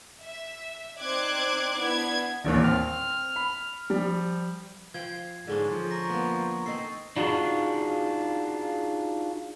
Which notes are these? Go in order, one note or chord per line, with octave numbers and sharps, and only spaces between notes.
E5
C4 D#4 D5 D6 F#6 G#6
B3 D4 E4 G#6
D#1 A1 D#2 D5
C4 F6
B5
F3 G3
F3 C5 G5 G#6
G#2 D3 C#4 D4 G#4
F3
A#5 C#6 A#6
A#3 B3
C4 D#4 A4 C7
D4 D#4 F4 F#4 G#4